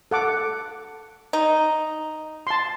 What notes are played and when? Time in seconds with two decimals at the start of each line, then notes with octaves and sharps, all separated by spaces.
0.11 A4 F#5 D6
1.33 D#4
2.47 A5 C6